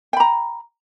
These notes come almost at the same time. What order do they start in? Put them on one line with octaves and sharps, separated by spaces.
G5 B5 A#5